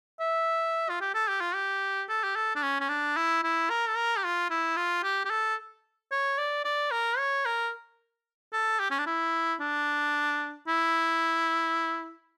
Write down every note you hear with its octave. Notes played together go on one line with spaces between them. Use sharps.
E5
F4
G4
A4
G4
F4
G4
A4
G4
A4
D4
C#4
C#4
D4
E4
E4
A#4
A4
A#4
G4
F4
E4
F4
G4
G4
A4
C#5
D5
D5
A#4
C#5
A#4
A4
G4
C#4
D4
E4
D4
E4